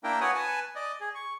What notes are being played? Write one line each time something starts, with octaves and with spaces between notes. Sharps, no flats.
A#3 D4 E4 A#4 G5
F#4 B4 C#5 F#5 G#5 D#6
B4 G#5 A5
D5 D#5
G#4
C#6